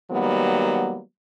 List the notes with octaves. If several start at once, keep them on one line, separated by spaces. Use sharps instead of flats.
D#3 F#3 G3 A#3 B3